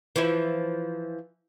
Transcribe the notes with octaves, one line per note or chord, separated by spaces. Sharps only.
E3 F3 E4